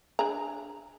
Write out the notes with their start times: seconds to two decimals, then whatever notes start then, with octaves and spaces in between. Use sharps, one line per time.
0.19 D4 G#4 A#5